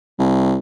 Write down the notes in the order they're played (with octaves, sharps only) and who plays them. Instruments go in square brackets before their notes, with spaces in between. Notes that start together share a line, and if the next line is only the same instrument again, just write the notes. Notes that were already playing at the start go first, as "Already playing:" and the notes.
[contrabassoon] C2